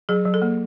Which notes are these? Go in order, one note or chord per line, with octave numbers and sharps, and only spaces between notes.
F#3 G#4
F#3
A4
A#3